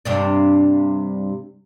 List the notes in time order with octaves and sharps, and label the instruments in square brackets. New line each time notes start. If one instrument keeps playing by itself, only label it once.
[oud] G2 C3 D4